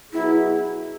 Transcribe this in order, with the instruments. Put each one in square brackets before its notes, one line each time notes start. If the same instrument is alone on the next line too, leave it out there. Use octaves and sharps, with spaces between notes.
[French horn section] B2 F#3 B3 G#4 [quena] E4